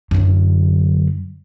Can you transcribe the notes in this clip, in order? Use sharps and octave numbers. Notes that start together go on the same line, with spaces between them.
F#2 D3